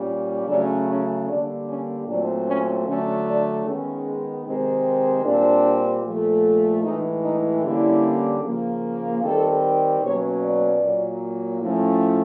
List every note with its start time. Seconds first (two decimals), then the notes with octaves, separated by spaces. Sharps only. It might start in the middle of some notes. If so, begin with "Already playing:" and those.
Already playing: A#2 G3 A#3 C#4
0.47 C#3 F#3 A3 C#4 D4
0.88 C#4
1.27 D3 G3 A#3 D4
1.67 C#4
2.07 A#2 F#3 A3 C4 D4
2.46 C#4
2.86 D3 F#3 A3 C#4
3.25 D4
3.65 D#3 G#3 B3 C#4
4.45 C3 D#3 G#3 C4
5.25 A#2 G3 C4 D4
6.04 A#2 F3 A3
6.83 A2 E3 G#3 D#4
7.24 D#4
7.63 D3 G3 A#3 C#4 E4
8.43 C#3 F3 A#3
9.22 D#3 G3 C4 A4
10.01 B2 F#3 A#3 C#4 C#5
10.42 D5
10.82 A#2 F#3 A#3
11.61 A2 F3 A3 C#4